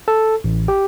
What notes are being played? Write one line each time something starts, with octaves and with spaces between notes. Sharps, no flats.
A4
A1
G4